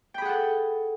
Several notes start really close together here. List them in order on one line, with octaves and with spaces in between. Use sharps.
G5 B5 G#4 F#5 A4